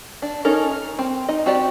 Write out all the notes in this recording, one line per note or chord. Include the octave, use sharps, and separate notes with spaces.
D4
C#4 D#4 A4 A#4 C#5
A#4
C4
D#4 D#5
C4 F#4 G4 D5